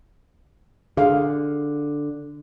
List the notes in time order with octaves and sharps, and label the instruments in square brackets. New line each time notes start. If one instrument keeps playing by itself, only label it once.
[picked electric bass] D3 [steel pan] G#4 F5